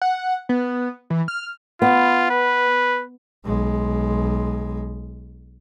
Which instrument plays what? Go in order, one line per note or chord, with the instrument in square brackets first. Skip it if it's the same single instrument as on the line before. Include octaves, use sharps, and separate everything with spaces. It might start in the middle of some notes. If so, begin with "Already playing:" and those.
[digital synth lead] F#5
B3
E3
F6
[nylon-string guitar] B3 [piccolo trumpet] F4
[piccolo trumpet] B4
[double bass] B1 G#3